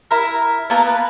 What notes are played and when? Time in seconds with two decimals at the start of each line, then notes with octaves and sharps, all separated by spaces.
0.11 E4 A#4
0.70 A#3 B3 A4 A#4
0.87 B4